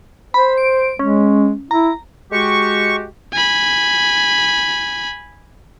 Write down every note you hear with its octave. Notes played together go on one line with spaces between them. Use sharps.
C5 B5
D7
G#3 C#4
E4 A#5
G#3 F#4 G4 C#6
G#5 B5